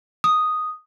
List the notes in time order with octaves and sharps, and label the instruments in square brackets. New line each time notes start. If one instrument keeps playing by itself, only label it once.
[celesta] D#6